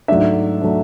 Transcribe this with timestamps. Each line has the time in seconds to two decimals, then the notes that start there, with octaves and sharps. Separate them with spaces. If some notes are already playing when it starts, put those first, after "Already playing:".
0.08 G#2 F#3 A3 D4 E5
0.62 F#3 A3 D4